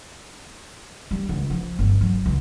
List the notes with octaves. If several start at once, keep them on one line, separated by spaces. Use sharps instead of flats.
G3
C#2
F3
G1
F#3
C#2